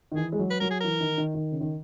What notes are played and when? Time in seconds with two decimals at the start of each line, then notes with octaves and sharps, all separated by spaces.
0.12 D#3
0.16 E3 G#4
0.32 G#3
0.39 F#3
0.50 B4
0.60 F#3 A#4
0.70 G#4
0.80 E3 A#4
1.01 D#3
1.18 D#3
1.34 D#3
1.52 C#3
1.61 D#3